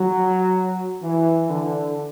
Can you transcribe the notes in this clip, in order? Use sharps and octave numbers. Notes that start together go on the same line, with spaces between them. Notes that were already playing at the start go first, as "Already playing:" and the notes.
Already playing: F#3
E3
D3